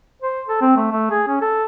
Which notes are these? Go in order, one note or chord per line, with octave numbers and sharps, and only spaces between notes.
C5
A4
C4
A3
A3
G#4
C#4
A4